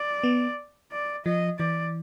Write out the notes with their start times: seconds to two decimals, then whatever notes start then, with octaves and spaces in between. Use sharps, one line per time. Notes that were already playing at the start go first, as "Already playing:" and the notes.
Already playing: D5
0.23 B3
0.92 D5
1.25 F3 D#5
1.59 E3 D5